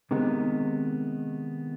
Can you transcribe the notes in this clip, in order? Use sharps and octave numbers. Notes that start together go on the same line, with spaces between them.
C3 D#3 G#3 B3